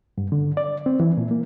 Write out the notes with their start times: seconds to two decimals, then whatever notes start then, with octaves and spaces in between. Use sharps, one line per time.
0.18 G2
0.32 D3
0.57 D5
0.86 C4
1.00 E3
1.17 A#2
1.31 A#3